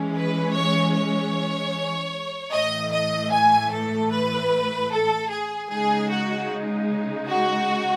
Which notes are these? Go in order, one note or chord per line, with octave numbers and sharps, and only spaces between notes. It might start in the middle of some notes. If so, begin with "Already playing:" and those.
Already playing: E3 G#3 C#4
B4
C#5
C#5
A2 E3 A3 D#5
D#5
G#5
A4
B4
A4
G#4
C#3 G#3 D#4 G#4
F#4
F#4